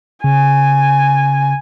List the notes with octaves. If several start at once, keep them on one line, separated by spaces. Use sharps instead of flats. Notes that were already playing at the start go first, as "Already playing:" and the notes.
C#3 G#5